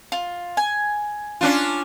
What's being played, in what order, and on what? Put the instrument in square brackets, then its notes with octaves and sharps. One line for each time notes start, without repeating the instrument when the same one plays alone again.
[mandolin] F4
G#5
[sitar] C#4 D4 F4